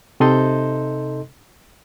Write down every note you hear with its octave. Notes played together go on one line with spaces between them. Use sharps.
C3 D#4 A4 D#5 C6 G6